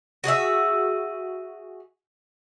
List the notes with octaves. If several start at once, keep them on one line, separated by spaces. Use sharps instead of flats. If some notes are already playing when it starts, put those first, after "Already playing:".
F#4 G#4 C#5 E5